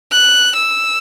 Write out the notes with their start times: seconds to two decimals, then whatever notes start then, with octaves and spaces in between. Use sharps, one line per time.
0.12 F#6
0.56 E6